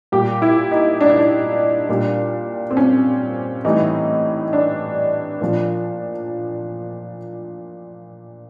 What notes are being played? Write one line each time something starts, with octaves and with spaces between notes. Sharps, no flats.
A#2 G3 G4
E4
D#4
D4
D#4
D4
A#2 G3
C4
C#4
A2 E3 G3 D#4
D4
A#2 F3